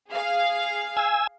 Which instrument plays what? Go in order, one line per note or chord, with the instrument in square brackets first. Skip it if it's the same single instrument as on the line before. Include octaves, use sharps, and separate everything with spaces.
[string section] G#4 F5
[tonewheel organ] G#5 E6